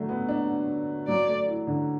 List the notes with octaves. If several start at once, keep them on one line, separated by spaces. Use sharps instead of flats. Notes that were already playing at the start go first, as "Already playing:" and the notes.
Already playing: D3 F#3 A3
B3
D4
F#3 D5
A3
E3
D3